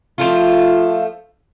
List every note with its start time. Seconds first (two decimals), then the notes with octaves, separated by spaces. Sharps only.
0.18 F3 A3 F4